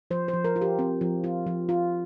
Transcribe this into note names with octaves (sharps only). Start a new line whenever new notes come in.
F3 C5
C5
F3
A#4
F4
G4
C4
F3
F4
F3
F4